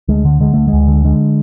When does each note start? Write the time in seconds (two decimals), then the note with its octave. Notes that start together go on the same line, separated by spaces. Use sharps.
0.09 D2 G#3
0.25 D3
0.40 D3 G#3
0.54 D2 A3
0.68 D2 G#3
0.88 D3
1.04 D3 G#3